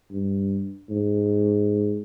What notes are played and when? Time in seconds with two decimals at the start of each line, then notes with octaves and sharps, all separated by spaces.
0.11 G2
0.90 G#2